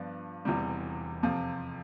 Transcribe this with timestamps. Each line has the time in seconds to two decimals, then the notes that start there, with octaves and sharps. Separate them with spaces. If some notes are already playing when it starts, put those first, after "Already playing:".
Already playing: G2 F3 B3 D4
0.45 E1 E2 C3 G3
1.23 F2 C3 F3